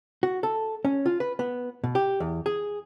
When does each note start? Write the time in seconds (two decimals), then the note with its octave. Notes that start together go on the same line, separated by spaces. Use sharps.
0.23 F#4
0.43 A4
0.85 C#4
1.06 F4
1.20 B4
1.39 B3
1.84 B2
1.95 G4
2.20 E2
2.46 G#4